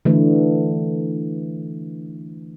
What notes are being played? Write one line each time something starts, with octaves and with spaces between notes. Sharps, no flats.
D3 E3 A3